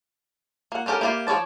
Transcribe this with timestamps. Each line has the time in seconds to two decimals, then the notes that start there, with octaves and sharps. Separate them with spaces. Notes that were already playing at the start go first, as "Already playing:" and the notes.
0.72 A#3 F#5
0.86 B3 C#4 G4 A4 A#4
1.01 A#3 E4 G4 D5 F5
1.27 F3 F#4 C#5 D5 A5